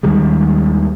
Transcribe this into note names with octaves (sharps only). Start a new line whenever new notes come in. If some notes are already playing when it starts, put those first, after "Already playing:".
D#2 D#3 G3 G#3